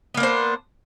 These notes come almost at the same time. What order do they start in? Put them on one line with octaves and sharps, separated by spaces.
B3 A#3 D4 C5